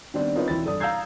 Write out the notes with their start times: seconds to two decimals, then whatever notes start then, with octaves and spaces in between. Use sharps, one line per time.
0.14 D#3 G3 B3 C4 D4
0.35 C4 D#4 F4 A#4 B4 C#5
0.48 E1 E3 C4 E4 B5 A6
0.65 G2 A4 D5 D#6
0.80 F5 A#5 E6 G6 G#6 C7